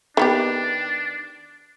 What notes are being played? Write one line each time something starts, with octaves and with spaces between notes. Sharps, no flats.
D#3 B3 D4 G4